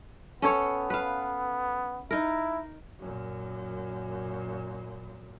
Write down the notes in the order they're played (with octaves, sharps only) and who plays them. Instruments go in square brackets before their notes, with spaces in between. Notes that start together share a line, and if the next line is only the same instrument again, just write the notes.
[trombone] B3 [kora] C#4 A4 C#5
[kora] B4 F5
[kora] D#4 A#4 [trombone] E4
[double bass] F#2 A#2